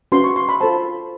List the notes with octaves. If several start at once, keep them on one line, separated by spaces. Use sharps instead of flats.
C#4 F#4 B4 C6
C#6
C6
B5
F4 A4 C5 A5